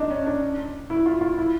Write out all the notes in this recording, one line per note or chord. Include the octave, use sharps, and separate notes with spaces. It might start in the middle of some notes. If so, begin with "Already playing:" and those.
Already playing: D4 D#4
C#4
D4
E4
F4
F4
E4